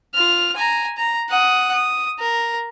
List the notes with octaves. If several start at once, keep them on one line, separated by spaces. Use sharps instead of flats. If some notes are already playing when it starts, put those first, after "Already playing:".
F4 F6
G#5 A#5
A#5
F#5 D#6
D#6
A#4